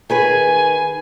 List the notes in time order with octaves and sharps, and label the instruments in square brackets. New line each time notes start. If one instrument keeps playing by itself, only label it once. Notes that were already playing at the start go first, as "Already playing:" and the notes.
[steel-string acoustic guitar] D#3 G#4 B4 [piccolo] G#5